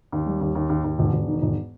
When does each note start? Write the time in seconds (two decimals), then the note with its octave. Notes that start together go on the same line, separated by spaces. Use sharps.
0.12 D#2
0.26 G3
0.41 D#2
0.55 D#2
0.69 D#2
0.84 D#2
0.99 E1
1.13 E1
1.28 D#3
1.42 E1